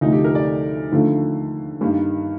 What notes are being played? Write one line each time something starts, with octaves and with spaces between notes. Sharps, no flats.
D2 C3 F3 A3 D#4
G4
A#4
D5
D#2 D3 F3 A3
G2 D#3 G3 A#3